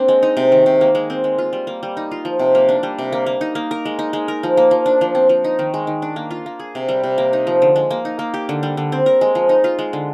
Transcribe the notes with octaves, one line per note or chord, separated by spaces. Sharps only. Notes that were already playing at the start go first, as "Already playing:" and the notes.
Already playing: A#3 C4 D4
G#3
D#4
C3
D#3
C3
A#3
G#3
C4
G#3
F4
G3
A#3
G3
D#4
F4
F3
C3
A#3
D4
G3
C3
A#3
A#3
D#4
A#3
A#4
G#3
D#4
G#3
A#4
F3
A#3
F3
D4
F3
C4
F3
D#4
D#3
G#3
D#3
D4
A#3
F4
A#3
G#4
C3
G3
C3
A#3
D#4
F3
D3
G#3
A#3
D#4
A#3
G4
D3
G3
D3
C4
A#4
G#3
F3
D#4
F4
G#3
D3